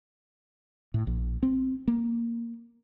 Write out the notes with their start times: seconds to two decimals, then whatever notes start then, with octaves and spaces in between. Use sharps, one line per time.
0.94 A2
1.07 A#1
1.43 C4
1.88 A#3